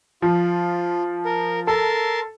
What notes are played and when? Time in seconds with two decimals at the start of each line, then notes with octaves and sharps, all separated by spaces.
0.22 F3 F4
1.25 A#4
1.67 A4 A#4 A5 C6